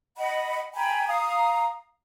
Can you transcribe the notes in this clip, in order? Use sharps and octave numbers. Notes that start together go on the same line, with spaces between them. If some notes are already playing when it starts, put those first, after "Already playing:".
D#5 F#5 B5
G5 G#5 A#5 B5
F5 A#5 D#6